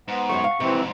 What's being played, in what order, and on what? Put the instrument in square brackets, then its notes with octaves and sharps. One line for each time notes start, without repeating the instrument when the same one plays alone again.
[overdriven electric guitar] G#2 [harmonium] B3
[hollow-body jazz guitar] F#2 F#3 A3 [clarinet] C#6
[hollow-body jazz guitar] F5 F#5
[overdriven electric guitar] F2 G#2 [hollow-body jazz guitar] C3 [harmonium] E3 C4